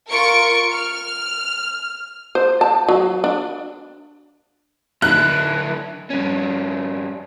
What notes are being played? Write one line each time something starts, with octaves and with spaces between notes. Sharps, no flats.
F4 A#4 C#6 C#7 D7
F6
C5
A5
F#3
D4
D3 E4 F#6
G2 C#4